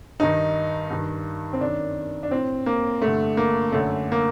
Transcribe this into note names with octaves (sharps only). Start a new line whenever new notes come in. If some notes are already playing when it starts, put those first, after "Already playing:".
G2 D#3 D#4
G2 D#3
C4
F#2 D#3 D4
D4
A2 C4
A#3
G2 D3 A3
A#3
F#2 D3 A3
A#3